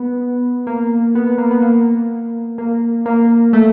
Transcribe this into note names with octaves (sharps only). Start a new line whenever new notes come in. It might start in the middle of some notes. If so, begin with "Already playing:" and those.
Already playing: B3
A#3
B3
B3
A#3
B3
A#3
A#3
A#3
A3